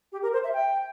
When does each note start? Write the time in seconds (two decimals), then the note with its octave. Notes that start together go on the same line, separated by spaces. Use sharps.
0.12 G4
0.23 A#4
0.33 C5
0.44 E5
0.53 G5